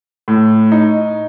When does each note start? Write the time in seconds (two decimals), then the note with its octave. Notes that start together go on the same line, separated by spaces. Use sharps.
0.28 A2
0.72 D#4